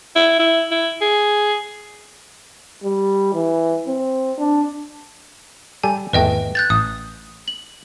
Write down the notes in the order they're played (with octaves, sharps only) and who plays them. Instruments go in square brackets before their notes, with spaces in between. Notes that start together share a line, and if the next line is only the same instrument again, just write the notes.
[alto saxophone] E4
E4
E4
G#4
[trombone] G3
E3
C4
D4
[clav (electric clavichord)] G3 G4 A4 [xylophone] G#5
[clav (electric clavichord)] G#1 E2 A3 [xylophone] B4 D#5 G5
[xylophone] F#6 G6 A6
[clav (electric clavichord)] A1 [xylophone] D#6
[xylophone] F#7